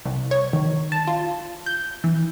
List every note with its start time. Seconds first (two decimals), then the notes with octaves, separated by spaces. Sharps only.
0.06 C2
0.31 C#5
0.53 D#3
0.92 A5
1.07 F4
1.66 G6
2.04 E3